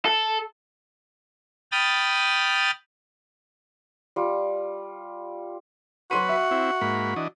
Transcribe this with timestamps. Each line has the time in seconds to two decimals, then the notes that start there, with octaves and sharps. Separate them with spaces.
0.05 A4
1.72 G5 B5 D#6 F6 A6
4.16 G3 F4
6.11 F#3 F#4 B4 C6 D#7
6.29 E5
6.51 C4 E4
6.81 G#2 A#3 B5
7.16 E3 D4 D#5